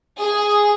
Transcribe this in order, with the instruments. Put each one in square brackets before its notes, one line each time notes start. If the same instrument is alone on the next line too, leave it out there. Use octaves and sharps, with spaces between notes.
[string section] G#4